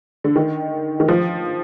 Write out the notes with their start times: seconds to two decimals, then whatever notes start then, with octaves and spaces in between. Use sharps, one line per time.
0.24 D3
0.36 D#3
1.00 D#3
1.08 F3